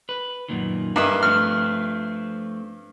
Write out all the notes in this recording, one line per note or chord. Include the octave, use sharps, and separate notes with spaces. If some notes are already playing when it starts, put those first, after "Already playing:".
B4
F#2 A#2 D#3
G2 A#3 E4 D#5 E6
F3 A3 C4 F6